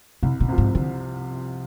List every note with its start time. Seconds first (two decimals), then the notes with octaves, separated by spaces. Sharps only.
0.23 C2 C3
0.40 B2
0.48 C3 F3
0.58 G#2
0.75 D3